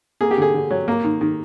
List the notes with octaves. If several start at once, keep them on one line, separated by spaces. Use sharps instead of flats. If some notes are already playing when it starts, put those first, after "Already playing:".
A#3 G#4
G4
D3 G#4
D3
F#3
A#3
D#3
D#3